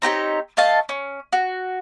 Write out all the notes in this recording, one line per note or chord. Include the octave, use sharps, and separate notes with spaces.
C4 D#4 G4 C#5
A3 D#5 F5 A5
C#4
F#4